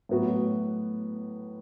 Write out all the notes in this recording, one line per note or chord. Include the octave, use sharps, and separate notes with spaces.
A2 F#3 B3 F#4